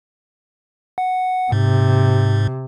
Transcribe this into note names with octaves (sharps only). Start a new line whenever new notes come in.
F#5
G#2 C3